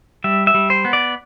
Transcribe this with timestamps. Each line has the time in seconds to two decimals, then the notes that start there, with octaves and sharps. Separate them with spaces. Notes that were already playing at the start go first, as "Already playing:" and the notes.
0.24 G3 E5
0.47 E5
0.54 G3
0.70 C5
0.85 B3
0.93 D5